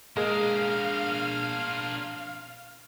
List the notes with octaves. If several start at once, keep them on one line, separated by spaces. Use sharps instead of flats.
G#3 A#3 D4 A#4 F5 F6